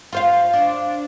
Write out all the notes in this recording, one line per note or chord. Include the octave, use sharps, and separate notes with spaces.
F4 C5 F5
D4